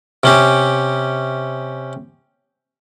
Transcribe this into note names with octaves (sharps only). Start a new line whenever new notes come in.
C3 C#4 G4